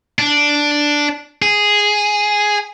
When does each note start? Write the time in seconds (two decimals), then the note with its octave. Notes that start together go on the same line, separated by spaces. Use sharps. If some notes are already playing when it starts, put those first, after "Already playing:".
0.19 D4
1.42 G#4